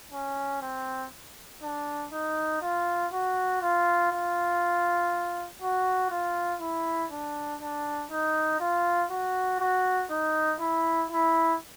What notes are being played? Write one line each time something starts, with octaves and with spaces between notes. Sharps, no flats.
C#4
C4
D4
D#4
F4
F#4
F4
F4
F#4
F4
E4
D4
D4
D#4
F4
F#4
F#4
D#4
E4
E4